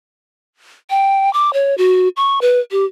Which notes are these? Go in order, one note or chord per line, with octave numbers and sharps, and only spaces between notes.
G5
D6
C#5
F#4
C#6
B4
G4